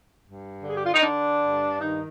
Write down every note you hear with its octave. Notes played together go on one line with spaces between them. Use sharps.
G2
D3 G#4
G4
F4
D#4
D3 D4
G2
D#3 D#4